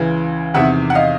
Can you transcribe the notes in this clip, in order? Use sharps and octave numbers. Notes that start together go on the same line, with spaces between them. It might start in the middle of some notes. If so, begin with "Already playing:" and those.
Already playing: C#2 C#3 E3
E2 C3 D#3 E5 F#5
F#5
D#5 F5